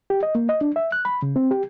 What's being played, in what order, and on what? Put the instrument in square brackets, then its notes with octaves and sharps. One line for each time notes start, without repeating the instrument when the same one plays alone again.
[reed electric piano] G4
D#5
A#3
D#5
D4
E5
F#6
B5
C#3
C4
G4